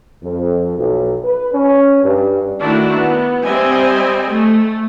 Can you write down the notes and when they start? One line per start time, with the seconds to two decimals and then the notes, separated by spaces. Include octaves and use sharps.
0.23 F2
0.77 B1
1.23 B4
1.53 C#4
2.04 G2
2.61 D#3 A3 D4 E4 F#4
2.96 B3
3.43 G3 C4 D#5 E5 G#5
4.30 A3